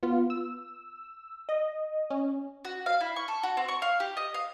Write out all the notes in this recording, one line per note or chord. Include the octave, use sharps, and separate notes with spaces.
B3 F4
E6
D#5
C#4
F#4
F5
E4
C#6
A4
F#4
C4
C#6
F5
G4
D#5
F5